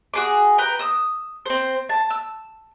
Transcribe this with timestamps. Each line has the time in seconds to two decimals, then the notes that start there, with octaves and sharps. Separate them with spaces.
0.14 F#4 G#4 D6
0.58 B4 G5 A#5
0.79 D#6 E6
1.46 C4 C5
1.89 A5
2.10 E6